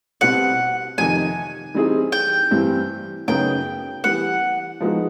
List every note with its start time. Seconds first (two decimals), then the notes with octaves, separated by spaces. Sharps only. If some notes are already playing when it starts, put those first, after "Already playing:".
0.21 B2 G3 C4 F#5
0.98 F2 C3 D#3 G#5
1.74 E3 G3 C4 D#4 G#4
2.12 G5
2.51 G2 E3 G3 C4
3.28 F#2 C#3 F#3 B3 D#4 G5
4.04 E3 G3 B3 F#5
4.80 F3 G#3 B3 D#4 F#4